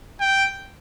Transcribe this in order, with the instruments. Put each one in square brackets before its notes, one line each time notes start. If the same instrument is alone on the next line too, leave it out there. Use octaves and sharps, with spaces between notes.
[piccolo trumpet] G5